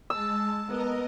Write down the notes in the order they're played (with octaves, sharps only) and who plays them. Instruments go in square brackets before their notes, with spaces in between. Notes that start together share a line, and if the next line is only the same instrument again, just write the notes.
[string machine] G#3 A5 [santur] E6
[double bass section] B3 [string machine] A#4 D#5